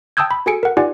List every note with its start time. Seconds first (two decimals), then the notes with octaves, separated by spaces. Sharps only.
0.17 G5 A5 D#6 E6 G6 G#6
0.31 B5
0.46 F#4 G#4 A4 G#5 C#7 D7
0.63 A#4 F#5
0.77 D#4 F4 G4 D5 F#5 G#5